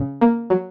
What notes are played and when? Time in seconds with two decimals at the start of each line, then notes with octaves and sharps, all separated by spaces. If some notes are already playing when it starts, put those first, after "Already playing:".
Already playing: C#3
0.21 A#3
0.50 F#3